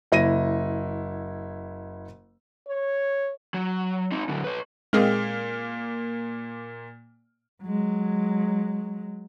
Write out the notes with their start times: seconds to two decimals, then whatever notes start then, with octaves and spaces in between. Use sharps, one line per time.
0.12 F#1 E4 A#6 D#7
2.67 C#5
3.54 F#3
4.12 C4 D#4
4.29 D3 F#3
4.44 B4 C#5
4.93 A#2 G#3 A#3 C4 G#4 F6
7.63 F#3 G#3